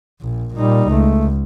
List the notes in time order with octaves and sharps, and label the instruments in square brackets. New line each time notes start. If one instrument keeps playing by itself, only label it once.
[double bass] A#1
[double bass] A#2 D#4 [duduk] G3
[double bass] C#2 [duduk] A3